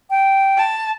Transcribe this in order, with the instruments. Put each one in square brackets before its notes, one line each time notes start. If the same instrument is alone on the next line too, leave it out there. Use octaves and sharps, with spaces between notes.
[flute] G5
[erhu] A5